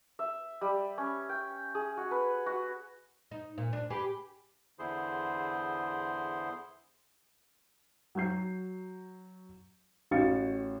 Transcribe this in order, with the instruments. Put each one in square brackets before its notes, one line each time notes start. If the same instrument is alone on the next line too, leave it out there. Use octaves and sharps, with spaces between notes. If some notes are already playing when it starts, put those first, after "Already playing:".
[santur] E5
G3
C#4
G5
G#4
F#4
B4
F#4
[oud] D#4
A#2
D4
G4 G#4 B4
[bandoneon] E2 D3 E4 G#4 C5 C6
[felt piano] F#3 F#4 G6 C7
A1 F#4 F5 A6 C#7